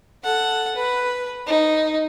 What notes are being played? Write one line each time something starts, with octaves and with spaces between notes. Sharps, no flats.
A4 F#5
B4
D#4